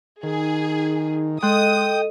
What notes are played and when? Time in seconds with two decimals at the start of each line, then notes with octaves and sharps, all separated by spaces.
0.23 D#3 D#4 G#4
1.43 G#3 A4 D#5 G5 C6 D#6 F#6